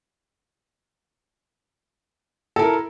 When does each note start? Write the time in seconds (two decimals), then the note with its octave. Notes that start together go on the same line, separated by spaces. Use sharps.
2.56 A4
2.59 E4
2.62 A#4